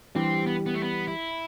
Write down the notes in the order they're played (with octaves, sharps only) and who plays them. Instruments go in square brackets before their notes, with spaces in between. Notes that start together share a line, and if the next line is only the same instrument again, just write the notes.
[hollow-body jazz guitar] E3 G3 D4 G4 [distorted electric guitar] C4
[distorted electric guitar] B3
B3
A3
B3
E4